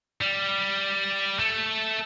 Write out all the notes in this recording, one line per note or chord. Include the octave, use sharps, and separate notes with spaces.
G3
A3